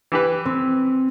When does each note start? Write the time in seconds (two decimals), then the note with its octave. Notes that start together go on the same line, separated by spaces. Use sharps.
0.12 E3 G4 B4
0.46 C4